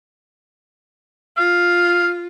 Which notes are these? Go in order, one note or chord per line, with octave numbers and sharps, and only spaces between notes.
F4 F5